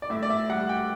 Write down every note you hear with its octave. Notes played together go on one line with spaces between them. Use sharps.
D5
A2 E5
D5
E5
G3 F#5
G5